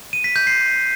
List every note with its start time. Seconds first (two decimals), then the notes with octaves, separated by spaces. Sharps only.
0.13 D#7
0.24 B6
0.36 G6
0.47 C7